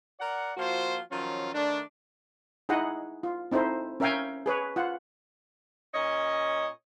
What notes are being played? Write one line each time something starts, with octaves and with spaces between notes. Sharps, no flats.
A#4 D5 F#5
F3 A#3 F4 F#4 C5
D#3 F3 F#3 C#4 F4
D#3 A3 D4
D#4 E4 G#4 D#5 F#5
F4
C4 D#4 E4 A4 C5
C#4 A#4 E5 F5 G5 G#5
G#4 B4 C#5
F4 F#5
A#2 C#4 C#5 D#5